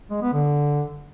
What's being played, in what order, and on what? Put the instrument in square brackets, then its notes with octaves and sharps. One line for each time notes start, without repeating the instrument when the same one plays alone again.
[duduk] G#3
B3
D3